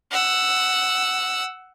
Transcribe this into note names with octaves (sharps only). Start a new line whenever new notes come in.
F#5 E6